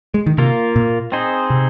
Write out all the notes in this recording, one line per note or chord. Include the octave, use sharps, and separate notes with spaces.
G#3
D#3
C3 A#3 F4 A#4
A#2
C4 D#4 G#4 C5
C3